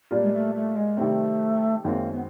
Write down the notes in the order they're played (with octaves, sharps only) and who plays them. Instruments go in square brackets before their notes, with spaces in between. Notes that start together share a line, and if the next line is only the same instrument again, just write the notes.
[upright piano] A#2 G3 A#3 D4 F4
[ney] G#3
A3
A3
G#3
[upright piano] C3 D#3 G3 C4 [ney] A3
[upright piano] F#2 D#3 G#3 C4 [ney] A#3
[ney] B3